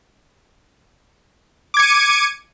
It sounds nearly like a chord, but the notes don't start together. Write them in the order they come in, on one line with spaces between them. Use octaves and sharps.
D6 G#6 C#7 D#7